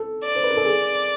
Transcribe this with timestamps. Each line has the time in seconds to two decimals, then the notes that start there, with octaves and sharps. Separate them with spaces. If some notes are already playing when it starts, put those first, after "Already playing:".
Already playing: A4
0.24 D5
0.35 C5
0.43 B4
0.50 A#4
0.57 A4
0.65 G#4